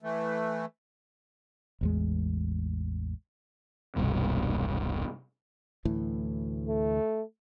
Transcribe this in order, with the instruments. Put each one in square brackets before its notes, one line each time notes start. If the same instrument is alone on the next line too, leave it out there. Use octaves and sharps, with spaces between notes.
[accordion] E3 A3
[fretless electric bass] A1 E2 G#3
[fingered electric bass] E1 C2 G2 B2
D2 A2 E3
[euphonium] A3